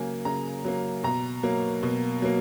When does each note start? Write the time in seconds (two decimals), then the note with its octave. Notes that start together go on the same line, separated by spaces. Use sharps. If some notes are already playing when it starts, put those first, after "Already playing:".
Already playing: C#3 F#3 A#3 G#5
0.25 C#3 A#5
0.65 F#3 A#3
1.03 B2 A#5
1.43 F#3 A#3
1.83 B2
2.22 F#3 A#3